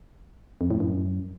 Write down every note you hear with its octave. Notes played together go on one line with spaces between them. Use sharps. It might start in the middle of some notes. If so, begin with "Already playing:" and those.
F2
A2
F#2